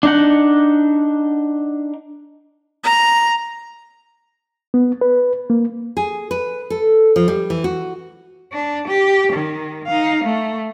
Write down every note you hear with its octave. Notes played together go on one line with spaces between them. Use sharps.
D4 D#4 F#5
A#5
B3
B4
A#3
G#4
B4
A4
F3
G3
E3
F#4
D4
G4
D#3
D#4 F5
A3